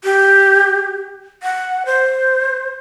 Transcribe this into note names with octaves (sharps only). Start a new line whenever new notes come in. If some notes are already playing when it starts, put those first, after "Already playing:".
G4
F#5
C5